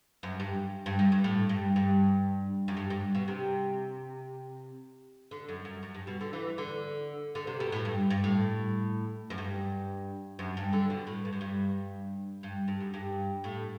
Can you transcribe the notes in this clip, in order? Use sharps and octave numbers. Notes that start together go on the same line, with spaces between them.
F#2
G2
G2
G2
G2
A2
G2
G2
F#2
G2
G2
B2
C3
D3
F#2
F#2
F#2
G2
B2
D3
E3
D3
D3
C3
B2
A2
G2
G2
A2
F#2
G2
F#2
G2
D3
B2
A2
G2
F#2
G2
G2
G2
F#2
G2
A2